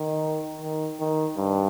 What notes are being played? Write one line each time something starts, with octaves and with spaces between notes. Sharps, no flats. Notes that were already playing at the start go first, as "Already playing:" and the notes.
Already playing: D#3
D#3
D#3
G2